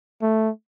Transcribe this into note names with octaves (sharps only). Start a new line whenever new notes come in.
A3